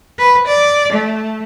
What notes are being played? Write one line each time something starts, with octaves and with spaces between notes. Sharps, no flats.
B4
D5
A3